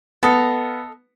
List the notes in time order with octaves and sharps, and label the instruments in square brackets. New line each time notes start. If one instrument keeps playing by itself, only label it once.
[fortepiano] B3 [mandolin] A4 D#5 F5